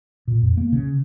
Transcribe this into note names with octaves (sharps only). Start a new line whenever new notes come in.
A#2
F2
A#3
C#3